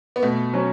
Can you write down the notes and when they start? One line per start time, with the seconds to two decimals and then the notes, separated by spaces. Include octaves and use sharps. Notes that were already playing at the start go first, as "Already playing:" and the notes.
0.16 B3
0.23 B2 A3
0.53 F#3 C#4